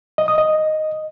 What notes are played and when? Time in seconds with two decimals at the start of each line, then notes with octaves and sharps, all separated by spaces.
0.18 D#5
0.28 D#6
0.38 D#5